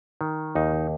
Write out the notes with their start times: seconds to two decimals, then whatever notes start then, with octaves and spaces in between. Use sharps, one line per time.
0.21 D#3
0.55 D#2 D#4